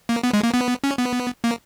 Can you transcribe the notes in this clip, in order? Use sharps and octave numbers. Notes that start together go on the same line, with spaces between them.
A#3
B3
G#3
A#3
B3
C#4
B3
A#3